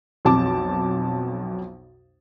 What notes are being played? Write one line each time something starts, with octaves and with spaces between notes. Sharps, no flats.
B1 F2 A5 D6